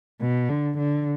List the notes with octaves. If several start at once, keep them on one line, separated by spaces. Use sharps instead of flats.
B2
D3
D3